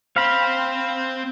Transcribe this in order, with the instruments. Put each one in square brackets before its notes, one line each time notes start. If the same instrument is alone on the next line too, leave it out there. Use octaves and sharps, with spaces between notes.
[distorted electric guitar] C4 C5 [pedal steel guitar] F5 B5